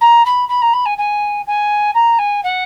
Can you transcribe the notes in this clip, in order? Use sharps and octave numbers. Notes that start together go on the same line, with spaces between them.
A#5
B5
B5
A#5
B5
G#5
G#5
G#5
A#5
G#5
F#5